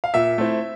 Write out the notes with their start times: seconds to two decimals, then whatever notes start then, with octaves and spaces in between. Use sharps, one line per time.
0.04 F5
0.14 A#2 E5
0.38 A3 C4 E4